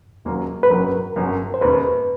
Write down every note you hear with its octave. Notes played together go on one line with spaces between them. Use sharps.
E1 D#2 C#3 F#3 A#3
B4
G1 F#2 C#3 F#3 A#4
G1 F#2 C#3 F#3
C5
E1 D#2 C#3 B4